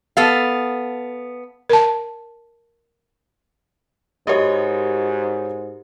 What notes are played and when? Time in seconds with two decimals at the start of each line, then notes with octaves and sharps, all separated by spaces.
0.17 B3 A4 F5
1.69 A#4 A5
4.27 G#2 F#4 G4 A#4 C#5 D#5